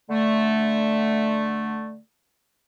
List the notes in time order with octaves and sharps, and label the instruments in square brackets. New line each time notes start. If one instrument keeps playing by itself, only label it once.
[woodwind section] D3 A3